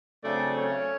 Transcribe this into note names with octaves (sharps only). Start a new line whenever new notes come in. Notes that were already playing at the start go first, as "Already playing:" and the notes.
C#3 F#3 A3 C4 D4 D5
C#4 C#5